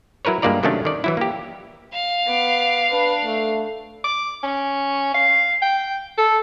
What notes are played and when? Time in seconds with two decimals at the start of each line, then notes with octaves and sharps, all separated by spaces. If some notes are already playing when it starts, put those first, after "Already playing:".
0.25 F#3 E4 A#4 B4 C#5
0.42 G2 G#3 A#3 F4 D5 A#5
0.63 C3 D#3 F#3 A3 C#4 D4
0.85 D#3 D5
1.04 E3 F#3 E4
1.17 A#3 G4
1.94 F5
2.26 B3 D6
2.92 D4 B4
3.25 A3
4.04 D6
4.43 C#4
5.14 F5
5.62 G5
6.18 A4